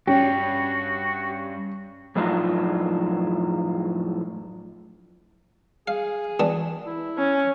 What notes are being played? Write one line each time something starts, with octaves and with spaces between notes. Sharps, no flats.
G2 G3 C#4 F#4 G4
F2 A2 F#3 D4 D#4 F4
G#4 F5
E3 B3 D4
E4
C#4